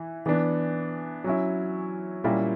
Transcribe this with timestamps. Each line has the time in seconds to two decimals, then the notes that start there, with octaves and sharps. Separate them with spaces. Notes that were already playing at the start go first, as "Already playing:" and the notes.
Already playing: E3 E4
0.26 E3 B3 D4
1.24 F#3 C#4 E4
2.24 A#2 G3 A#3 C#4 E4